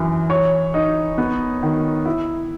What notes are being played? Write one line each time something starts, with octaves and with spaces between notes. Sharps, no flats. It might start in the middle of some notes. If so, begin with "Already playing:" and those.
Already playing: F#2 E3
C#5
D#4
B3
D#3
E4